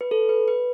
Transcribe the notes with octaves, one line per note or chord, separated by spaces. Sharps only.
B4
A4
B4
B4